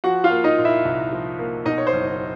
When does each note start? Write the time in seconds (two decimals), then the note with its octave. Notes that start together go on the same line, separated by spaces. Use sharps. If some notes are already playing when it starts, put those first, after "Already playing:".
0.04 F3 F#4 F#5
0.24 F4 F5
0.30 A#3
0.44 D#4 D#5
0.58 A#2
0.65 E4 E5
0.85 C2
1.12 F3
1.39 A#3
1.65 B2 D#4 D#5
1.78 C#5
1.87 C5
1.93 F#1